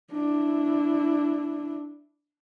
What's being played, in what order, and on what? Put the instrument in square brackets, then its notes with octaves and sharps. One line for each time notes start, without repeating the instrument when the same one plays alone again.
[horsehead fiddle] D4 E4